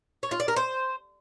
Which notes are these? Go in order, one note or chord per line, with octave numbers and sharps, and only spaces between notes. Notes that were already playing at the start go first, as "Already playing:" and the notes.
C#5
F4
D5
A#4
C5